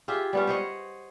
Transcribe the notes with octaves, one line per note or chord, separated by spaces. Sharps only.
F4 G4 G#4 E5
G3 B3 C#4
C5 C#5 D#5 F#5